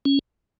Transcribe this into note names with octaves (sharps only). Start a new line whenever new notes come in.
C#4